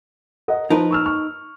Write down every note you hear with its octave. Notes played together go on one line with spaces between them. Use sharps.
A#4 D#5 F#5
F3 D#4 A#4 B4
C#6 E6 F6
C#6 F6